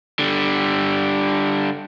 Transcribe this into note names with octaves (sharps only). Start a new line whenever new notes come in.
D3 G3